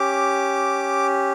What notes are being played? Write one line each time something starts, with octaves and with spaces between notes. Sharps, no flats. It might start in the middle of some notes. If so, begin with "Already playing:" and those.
Already playing: C#4 G4 D6